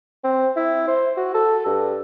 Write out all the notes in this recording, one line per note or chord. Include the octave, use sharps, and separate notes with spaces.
C4
E4
C5
F#4
A4
G2